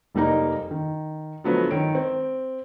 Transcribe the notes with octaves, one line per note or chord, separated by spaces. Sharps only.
F1 G3 A#3 D#4 A#5
D#3
D3 F3 F#3 A3 B3
D#3 C#5 D7
C4